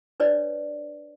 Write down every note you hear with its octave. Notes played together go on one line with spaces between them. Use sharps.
D4 B4 C#5 D5